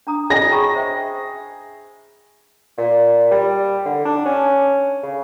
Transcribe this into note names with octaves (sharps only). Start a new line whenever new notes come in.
D4 A#5 D#6
G#4 C#5 D#5 G5 A#6
A#5 B5 C#6
C5 E5 G5
A#2
G3
D3
D4
C#4
C#3